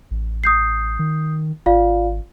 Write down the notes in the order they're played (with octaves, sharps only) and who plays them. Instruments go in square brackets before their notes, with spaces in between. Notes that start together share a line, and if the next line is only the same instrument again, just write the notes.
[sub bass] A1
[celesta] D#6 G6 C7
[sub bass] D#3
[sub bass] G#1 [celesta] F4 D5 F5